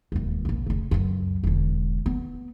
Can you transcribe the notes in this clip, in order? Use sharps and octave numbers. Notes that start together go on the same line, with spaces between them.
E1 D#2
A#1 A#2
F1 C#3
C#2 F#2
E1 D3
B3